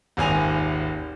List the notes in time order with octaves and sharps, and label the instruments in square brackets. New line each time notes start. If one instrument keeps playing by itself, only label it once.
[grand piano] D#1 G#1 G#5 F7